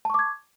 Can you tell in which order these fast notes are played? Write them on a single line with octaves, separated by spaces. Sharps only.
A5 C#6 D6 G#6